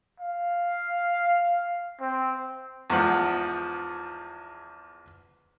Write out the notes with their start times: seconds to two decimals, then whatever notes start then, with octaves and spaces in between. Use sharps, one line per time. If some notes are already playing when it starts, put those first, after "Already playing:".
0.20 F5
2.00 C4
2.90 E2 G#2 F3 F#5